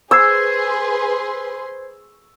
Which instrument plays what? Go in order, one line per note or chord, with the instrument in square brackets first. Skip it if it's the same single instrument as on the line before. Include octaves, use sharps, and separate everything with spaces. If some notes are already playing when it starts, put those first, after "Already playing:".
[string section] G#4 B4 C6 [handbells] C5 G#6 C7 [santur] E6